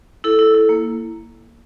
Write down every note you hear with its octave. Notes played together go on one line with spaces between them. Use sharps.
E4 A4
E4
E4
A#3